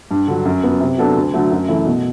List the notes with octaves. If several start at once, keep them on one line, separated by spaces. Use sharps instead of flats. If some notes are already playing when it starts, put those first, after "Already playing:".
G2
D3 F#3
F#2
F#3 B3
C3
F#3 B3 D4 A4
D2
D3 F#3 A3
F#2
E3 A3 E4 A4
B2